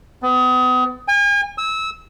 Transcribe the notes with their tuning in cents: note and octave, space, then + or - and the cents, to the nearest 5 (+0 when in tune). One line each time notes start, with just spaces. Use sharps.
B3 +35
G#5 -40
E6 -25